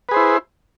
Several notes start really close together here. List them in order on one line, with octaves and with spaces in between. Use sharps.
B4 G#4 C5 E4